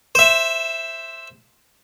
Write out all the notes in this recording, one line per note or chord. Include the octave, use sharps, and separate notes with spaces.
C5 E5